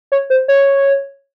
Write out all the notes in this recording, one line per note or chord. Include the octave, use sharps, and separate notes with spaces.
C#5
C5
C#5